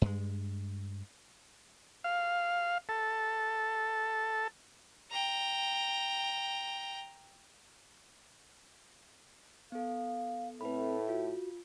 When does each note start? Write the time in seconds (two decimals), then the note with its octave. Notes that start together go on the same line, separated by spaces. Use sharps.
0.02 G2 G#3
2.04 F5
2.89 A4
5.11 G5 A#5
9.72 B3 A4 F5
10.61 A2 A3 C4 E4 B4 B5
11.08 F4 F#4